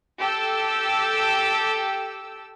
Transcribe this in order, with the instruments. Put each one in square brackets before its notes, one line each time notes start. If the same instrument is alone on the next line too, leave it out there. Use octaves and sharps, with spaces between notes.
[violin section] G4 A4 G5 E6